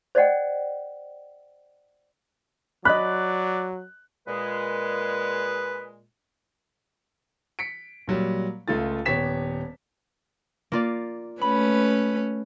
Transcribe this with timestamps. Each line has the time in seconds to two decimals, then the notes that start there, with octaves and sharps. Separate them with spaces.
0.15 C5 D5 D#5 F#5 G5
2.85 F#3 D5 D#5 B5 F#6
4.27 A#2 G#3 B4
7.59 B6 C#7 D7
8.08 A#2 F#3 G3
8.68 C#2 A3 F4 A6
9.06 D#1 B3 G4 C#5 B6 E7
10.72 A#3 F4 D5
11.41 A3 C#4 B4 B5